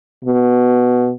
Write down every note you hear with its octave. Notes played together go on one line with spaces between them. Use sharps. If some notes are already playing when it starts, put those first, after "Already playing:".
B2